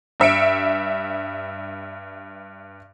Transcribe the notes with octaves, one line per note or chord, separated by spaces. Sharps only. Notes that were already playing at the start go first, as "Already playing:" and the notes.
G2 E5 C#7 D7